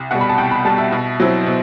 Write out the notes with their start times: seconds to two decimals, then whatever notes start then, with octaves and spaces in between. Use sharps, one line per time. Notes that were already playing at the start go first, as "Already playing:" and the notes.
Already playing: C2
0.11 B2 G3 F#5
0.21 B5
0.29 A5
0.38 C2 G5
0.51 B5
0.65 B2 G3 A5
0.78 E5
0.92 B2
1.20 F#3 C4 E4
1.46 B2